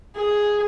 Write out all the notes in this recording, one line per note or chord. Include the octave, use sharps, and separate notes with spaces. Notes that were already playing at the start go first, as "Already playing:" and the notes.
G#4